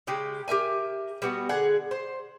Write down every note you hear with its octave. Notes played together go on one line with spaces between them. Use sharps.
C#3 G#3 G4
G4 A#4 E5 G#5
G3 B3 F#4
D3 G#4 F#5
C5